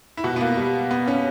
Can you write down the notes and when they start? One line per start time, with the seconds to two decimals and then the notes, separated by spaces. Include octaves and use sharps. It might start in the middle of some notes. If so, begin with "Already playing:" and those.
0.17 E4
0.24 B2 F#4
0.36 B3
0.41 A#3
0.57 G3
0.91 B3
1.08 C#4